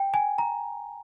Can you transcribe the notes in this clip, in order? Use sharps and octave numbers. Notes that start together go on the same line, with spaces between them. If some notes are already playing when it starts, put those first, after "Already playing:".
Already playing: G5
G#5
A#5